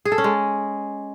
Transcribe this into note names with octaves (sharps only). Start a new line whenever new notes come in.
G#4
A4
C#4
G#3